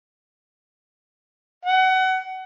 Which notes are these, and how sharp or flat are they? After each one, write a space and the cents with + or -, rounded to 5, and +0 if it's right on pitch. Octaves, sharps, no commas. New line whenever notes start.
F#5 +25